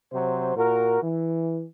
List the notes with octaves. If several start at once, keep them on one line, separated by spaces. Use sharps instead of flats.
C3 F#3 C5
A#2 F#4 A#4
E3